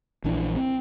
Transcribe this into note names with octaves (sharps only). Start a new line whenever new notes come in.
A#1 E3 D4
C4